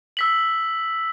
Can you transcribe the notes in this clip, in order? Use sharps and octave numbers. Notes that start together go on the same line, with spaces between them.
E6 B6 F#7